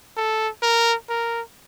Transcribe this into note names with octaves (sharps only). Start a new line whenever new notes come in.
A4
A#4
A#4